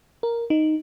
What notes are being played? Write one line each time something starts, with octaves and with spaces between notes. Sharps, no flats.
A#4
D#4